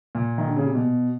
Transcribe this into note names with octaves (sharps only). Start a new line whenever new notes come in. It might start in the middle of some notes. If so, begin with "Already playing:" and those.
A#2
D#3
D3
C#3
C3
B2